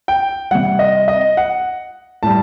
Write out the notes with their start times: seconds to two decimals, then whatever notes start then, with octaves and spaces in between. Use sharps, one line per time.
0.08 G5
0.51 C3 G3 F#5
0.79 D#5
1.08 D#5
1.37 F#5
2.23 A2 G3 A5